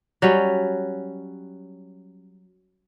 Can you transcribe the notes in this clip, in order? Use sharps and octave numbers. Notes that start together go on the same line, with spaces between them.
F#3 G3 C#4